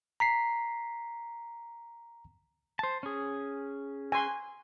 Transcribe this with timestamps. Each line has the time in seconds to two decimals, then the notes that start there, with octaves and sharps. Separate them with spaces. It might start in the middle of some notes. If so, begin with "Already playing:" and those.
0.20 A#5 B6 C7
2.79 C5 A5
3.03 C#4 G#4
4.12 G#5 C6